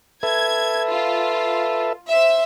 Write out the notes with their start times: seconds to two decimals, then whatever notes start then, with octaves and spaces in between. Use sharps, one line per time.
0.23 A4 B4 E5 G#6
0.90 F4
2.09 C5 E5